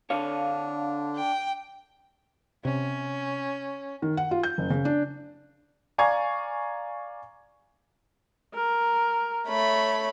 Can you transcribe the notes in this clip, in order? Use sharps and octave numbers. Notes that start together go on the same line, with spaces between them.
D3 D4 C#5 F5
G5
C3 C#4
D#3
F#5
F4
G6
F#1
C#3
D4
D5 F5 G#5 A#5 C#6 G#6
A#4
A3 C#5 B5